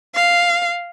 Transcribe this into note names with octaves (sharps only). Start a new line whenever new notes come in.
F5